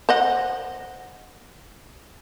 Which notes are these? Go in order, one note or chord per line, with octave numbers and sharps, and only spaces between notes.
C5 D#5 F#5